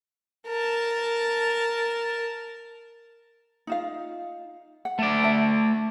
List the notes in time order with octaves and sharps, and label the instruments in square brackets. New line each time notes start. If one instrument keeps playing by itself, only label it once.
[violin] A#4 A5
[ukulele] D#4 F4 F5
F#5
[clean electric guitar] A3 D5
[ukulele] E5 A5